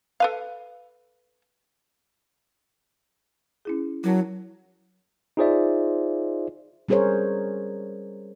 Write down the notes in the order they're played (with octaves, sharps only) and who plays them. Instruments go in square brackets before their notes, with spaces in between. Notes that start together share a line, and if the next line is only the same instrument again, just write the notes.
[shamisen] A4 B4 F5
[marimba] C#4 E4 G#4
[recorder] F#3 [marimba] E4 A#4 A5
[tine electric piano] D#4 F4 G#4 C5 D5 E5
[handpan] G3 C#4 G#4 A#4 C5 C#5